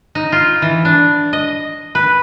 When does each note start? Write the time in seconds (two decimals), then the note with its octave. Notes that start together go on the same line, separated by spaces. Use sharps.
0.15 D#4
0.32 F4
0.62 E3
0.85 D4
1.33 D#5
1.95 B4